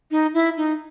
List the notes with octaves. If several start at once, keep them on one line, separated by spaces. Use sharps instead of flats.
D#4
E4
D#4